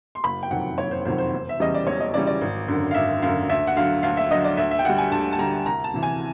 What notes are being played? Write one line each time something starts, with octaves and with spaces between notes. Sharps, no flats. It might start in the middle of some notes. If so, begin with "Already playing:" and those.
C6
F#1 B5
G5
F2 C3 D#3 F#3 F#5
F#1 C#5
C5
F2 C3 D#3 F#3 C5
C5
E1
E5
E2 C#3 E3 G3 D#5
D5
E1 C#5
D#5
E2 C#3 E3 G3 D5
D5
G#1
F#2 D3
F5
G#1 E5
F#2 D3 F5
D2 E5
F#5
D3 F#3 F5
D2 F5
E5
D3 F#3 D#5
D5
D2 E5
E5
G5
D3 G3 F#5
G#5
D2 A5
A5
D3 G3 A#5
C2 A#5
A5
C3 E3
G#5